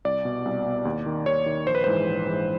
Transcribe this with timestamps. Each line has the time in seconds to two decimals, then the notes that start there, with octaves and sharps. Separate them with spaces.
0.05 C2 D5
0.25 B2
0.45 C2
0.65 B2
0.85 D#2
1.06 D#3
1.26 D#2 C#5
1.46 D#3
1.67 A#1 C5
1.75 B4
1.84 G#2 E3 C5
2.07 A#1
2.27 G#2 E3